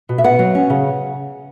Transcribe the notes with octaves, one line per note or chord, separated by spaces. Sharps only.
B2
E5
B3 F#5
F#3
C#4
C#3